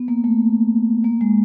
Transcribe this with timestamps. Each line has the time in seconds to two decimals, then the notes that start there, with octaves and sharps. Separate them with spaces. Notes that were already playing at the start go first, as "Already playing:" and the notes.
Already playing: B3
0.08 A#3
0.24 A3
1.04 A#3
1.21 G#3